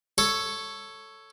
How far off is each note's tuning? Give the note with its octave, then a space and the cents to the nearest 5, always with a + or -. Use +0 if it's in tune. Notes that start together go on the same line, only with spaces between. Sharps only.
A4 +5 C#5 +0